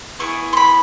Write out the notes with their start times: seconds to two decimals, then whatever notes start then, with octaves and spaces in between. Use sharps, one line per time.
0.19 B3 E4 G#4 C#6
0.53 C6
0.57 B5